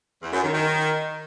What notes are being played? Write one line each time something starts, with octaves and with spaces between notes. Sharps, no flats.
E2
F#2
D#3
D#3